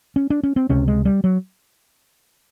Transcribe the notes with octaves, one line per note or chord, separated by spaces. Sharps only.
C#4
D4
C#4
C4
C#2 C3 C#4
G#3
G3
F#3